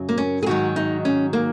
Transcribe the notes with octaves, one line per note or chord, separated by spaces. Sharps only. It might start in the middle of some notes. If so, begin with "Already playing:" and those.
Already playing: F#2 C#3 F#3
A#3
C#4
G#4
G#2 D#3 F#3 F#4
D#4
C#4
A#3